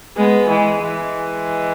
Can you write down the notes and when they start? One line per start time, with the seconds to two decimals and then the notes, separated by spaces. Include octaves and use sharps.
0.18 G#3 B3
0.49 E3 G#3
0.82 E3 G#3